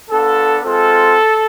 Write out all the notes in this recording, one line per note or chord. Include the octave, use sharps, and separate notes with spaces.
B3 D4 F4 A4
G#3 C4 F4 A4